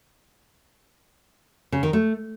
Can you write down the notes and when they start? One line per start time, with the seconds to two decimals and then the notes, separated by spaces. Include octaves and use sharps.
1.72 C#3
1.83 D#3
1.93 A3